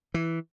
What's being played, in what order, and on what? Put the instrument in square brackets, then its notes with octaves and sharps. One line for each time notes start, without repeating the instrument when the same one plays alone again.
[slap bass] E3